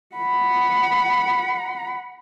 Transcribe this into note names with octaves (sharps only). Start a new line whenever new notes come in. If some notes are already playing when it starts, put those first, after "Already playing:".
F#5 B5